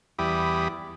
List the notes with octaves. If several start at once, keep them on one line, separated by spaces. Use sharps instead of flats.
E2 G3 E4 G4 B5 D#6